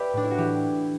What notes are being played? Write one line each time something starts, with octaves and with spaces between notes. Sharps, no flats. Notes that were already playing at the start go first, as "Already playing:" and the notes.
Already playing: G4 B4 D5 E5
A2 D4
E4
F#4
E3 E4 G4